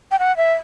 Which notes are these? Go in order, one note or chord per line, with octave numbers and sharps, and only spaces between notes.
G5
F#5
E5